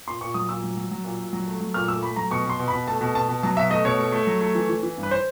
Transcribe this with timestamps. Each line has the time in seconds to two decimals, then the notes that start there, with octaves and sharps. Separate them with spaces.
0.07 A#2 C6
0.21 A#2 C#6
0.34 F#3 D#6
0.49 A#2 E6
0.64 F#3
0.77 F#3
0.91 F#3
1.04 A#2
1.19 A#2
1.33 F#3
1.47 A3
1.60 F#3
1.74 A#2 F6
1.88 A3 E6
2.02 A3 B5
2.16 F#3 A#5
2.31 B2 C#6
2.46 B2 C6
2.59 B2
2.68 B5
2.73 B2
2.88 A3 A5
3.01 B2
3.14 B2 A5
3.28 B2
3.43 F#3 A5
3.57 B2 E5
3.70 A3 D#5
3.84 B2 C#5
3.99 A3
4.12 A3
4.27 F#3
4.41 A3
4.55 E3
4.70 E3
4.83 E3
4.98 G2
5.03 B4
5.11 C5